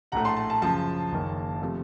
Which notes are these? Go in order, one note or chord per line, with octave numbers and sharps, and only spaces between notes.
A#1 A2 A3 F#5 A#5
A5 C6
A5
A5
F#2 C#3 F3 A5
F#1 F#2 D#3 A#3 C#4
C3 F3 A3